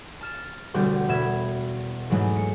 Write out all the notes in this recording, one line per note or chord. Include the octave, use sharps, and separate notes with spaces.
A5 F6 E7
E1 D2 B2 G3 F#4 G4
E1 B2 B4 E5 G#6 E7
G#2 E3 F#3 G#3 A3
C#7